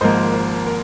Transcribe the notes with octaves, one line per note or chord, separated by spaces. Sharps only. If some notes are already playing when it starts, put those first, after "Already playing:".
G#1 G#2 F3 A#3 C5 D#5
C5
A#4